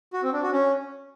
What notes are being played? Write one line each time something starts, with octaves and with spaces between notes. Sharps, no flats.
F#4
C4
D4
F#4
C#4